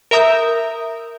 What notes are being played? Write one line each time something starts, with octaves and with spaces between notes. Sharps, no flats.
A#4 E5 A#5 D#6 G6